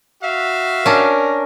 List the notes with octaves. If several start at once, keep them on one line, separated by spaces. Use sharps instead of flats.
F#4 E5 F5
C#4 D4 A#4